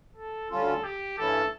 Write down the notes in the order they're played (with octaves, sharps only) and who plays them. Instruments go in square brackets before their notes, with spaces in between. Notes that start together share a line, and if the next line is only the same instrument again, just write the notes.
[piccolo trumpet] A4
[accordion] D2 D3 G3 C#4 F4 [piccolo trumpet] A4
[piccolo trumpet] G4
[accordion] G2 E3 A3 C#4 E4 [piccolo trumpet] A4